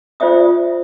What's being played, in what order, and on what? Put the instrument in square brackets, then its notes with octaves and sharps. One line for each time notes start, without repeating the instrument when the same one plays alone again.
[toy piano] F4 C5 D5 E5 D#6